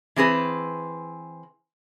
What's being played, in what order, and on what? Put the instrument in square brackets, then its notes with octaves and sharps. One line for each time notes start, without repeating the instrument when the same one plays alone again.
[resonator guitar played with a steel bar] E3 C4 G#4 B4